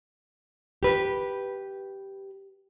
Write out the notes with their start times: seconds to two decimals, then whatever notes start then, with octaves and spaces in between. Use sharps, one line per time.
0.83 G4 B4